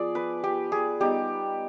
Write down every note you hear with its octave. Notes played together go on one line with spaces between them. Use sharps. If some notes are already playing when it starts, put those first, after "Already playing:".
Already playing: F3 B3 F4 G#4 D5
B4
G4
G#4
G3 B3 D#4 G4